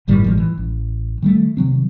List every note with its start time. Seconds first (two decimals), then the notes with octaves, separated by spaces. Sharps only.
0.08 G1 A2 D#3 G3
0.24 A1 A2 F3 G#3
0.38 E3
0.58 A1
1.22 D#3 G3 A3
1.57 C3 D#3 F#3 C4